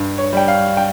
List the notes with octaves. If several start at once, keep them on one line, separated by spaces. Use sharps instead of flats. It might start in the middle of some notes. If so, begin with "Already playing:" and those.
Already playing: G2
C#5
G3 G5
F5
G5